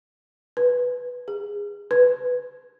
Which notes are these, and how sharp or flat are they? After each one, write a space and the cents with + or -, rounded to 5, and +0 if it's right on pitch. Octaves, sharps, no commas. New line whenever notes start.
B4 +0
G#4 -20
B4 +10